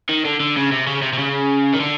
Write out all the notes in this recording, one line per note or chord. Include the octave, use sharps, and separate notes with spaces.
D#3
D3
D3
C#3
C3
C#3
C3
C3
C#3
D#3
D3